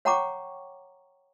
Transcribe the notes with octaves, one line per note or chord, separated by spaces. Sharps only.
C#5 F#5 G5 A#5 C#6 D6